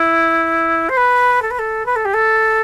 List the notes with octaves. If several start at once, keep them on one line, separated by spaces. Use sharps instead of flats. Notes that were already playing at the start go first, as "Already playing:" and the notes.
Already playing: E4
C5
B4
A4
B4
A4
B4
A4
G4
A4